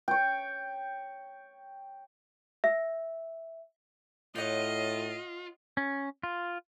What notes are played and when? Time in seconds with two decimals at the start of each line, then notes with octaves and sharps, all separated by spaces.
0.08 C#5 G5
2.64 E5
4.36 A2 F4 C#5 D#5 F#5 G5
5.77 C#4
6.23 F4